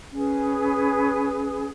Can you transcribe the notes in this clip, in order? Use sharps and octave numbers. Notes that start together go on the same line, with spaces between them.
C#4 G#4 B4